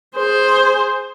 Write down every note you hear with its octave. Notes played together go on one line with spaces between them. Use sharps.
G#4 C5